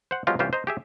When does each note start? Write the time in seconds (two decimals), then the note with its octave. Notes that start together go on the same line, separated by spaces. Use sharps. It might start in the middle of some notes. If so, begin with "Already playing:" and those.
0.11 C5 F#5
0.27 F3 F#3 G#3 B3 F4 G4
0.39 C2 E3 C#4 F4 G4 C5
0.53 C5 D#5 A#5
0.67 G4 G#4 E5